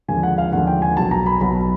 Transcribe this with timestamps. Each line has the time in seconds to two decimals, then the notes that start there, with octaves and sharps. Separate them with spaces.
0.08 D#2 D3 F3 G#3 G#5
0.23 F#5
0.38 F5
0.52 D#2 D3 F3 G#3 F#5
0.67 G5
0.82 G#5
0.97 B1 B2 F#3 A5
1.11 A#5
1.26 B5
1.41 B1 B2 F#3 B5